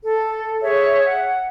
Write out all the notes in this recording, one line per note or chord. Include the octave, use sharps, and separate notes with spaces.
A4
G#4 C#5 E5
F#5